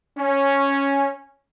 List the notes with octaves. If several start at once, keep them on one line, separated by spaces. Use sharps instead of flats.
C#4